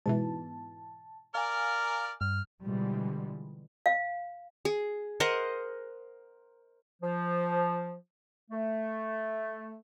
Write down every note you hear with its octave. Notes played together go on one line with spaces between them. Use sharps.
G#2 B2 E3 A5
A#4 D5 F5 G#5 F6
G2 F6
B2 D3 E3 F3 G3 G#3
F5
G#4
A#4 C5 D#5 F#5
F3
A3